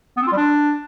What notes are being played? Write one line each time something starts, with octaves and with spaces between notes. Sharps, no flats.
B3
C4
F4
G3
D4